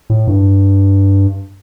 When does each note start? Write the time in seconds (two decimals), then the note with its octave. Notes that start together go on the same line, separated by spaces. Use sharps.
0.10 A2
0.27 G2